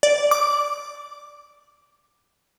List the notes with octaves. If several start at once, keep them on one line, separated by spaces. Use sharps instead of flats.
D5
D6